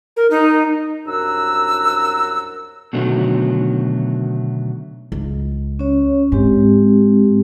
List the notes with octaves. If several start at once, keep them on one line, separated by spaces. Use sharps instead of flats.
A#4
D#4
C2 F#2 D4 F#5 A#5 E6
B2 D3 D#3 F#3 A3
C#2
C#4 C#5
G#2 G#3 C4 G4